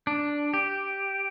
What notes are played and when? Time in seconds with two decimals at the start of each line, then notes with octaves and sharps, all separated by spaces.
0.07 D4
0.54 G4